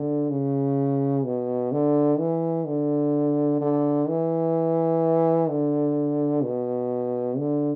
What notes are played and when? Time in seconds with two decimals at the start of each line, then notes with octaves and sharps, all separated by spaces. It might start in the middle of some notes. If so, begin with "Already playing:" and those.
Already playing: D3
0.30 C#3
1.25 B2
1.72 D3
2.19 E3
2.66 D3
3.61 D3
4.08 E3
5.50 D3
6.43 B2
7.38 D3